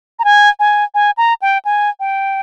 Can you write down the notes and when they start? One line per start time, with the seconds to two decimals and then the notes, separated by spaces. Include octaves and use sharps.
0.19 A#5
0.24 G#5
0.60 G#5
0.95 G#5
1.17 A#5
1.42 G5
1.65 G#5
2.00 G5